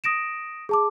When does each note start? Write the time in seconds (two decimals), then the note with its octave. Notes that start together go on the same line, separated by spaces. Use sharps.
0.04 D#6 A#6 D7 E7
0.69 G#4 A5 D6